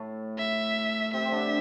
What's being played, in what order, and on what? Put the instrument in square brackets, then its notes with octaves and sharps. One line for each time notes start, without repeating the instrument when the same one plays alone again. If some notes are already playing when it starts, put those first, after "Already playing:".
Already playing: [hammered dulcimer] A2 A3
[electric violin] E5
[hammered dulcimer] C3 C4 [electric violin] E5
[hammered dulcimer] C4
D3 D4